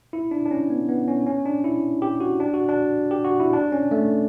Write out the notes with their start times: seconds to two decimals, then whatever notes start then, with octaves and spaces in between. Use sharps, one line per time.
0.13 E4
0.31 D4
0.46 D4
0.51 C#4
0.70 B3
0.88 B3
1.08 C#4
1.26 C#4
1.45 D4
1.64 E4
2.02 G4
2.20 F#4
2.40 D4
2.54 F#4
2.69 D4
3.11 G4
3.25 F#4
3.40 E4
3.53 D4
3.72 C#4
3.91 A3